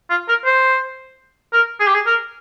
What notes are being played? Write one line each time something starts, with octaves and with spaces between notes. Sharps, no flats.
F4
A#4
C5
A#4
G#4
G4
G#4
A#4